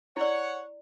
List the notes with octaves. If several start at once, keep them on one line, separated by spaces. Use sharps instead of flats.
E4 C#5 D5 F#5